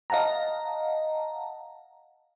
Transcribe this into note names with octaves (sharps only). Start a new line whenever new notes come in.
D#5 F5 F#5 A5 A#5